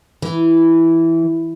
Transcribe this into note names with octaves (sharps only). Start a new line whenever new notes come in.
E3